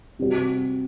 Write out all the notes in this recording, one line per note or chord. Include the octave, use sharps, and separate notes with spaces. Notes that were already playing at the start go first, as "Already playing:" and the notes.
C3 G3 C4 F#4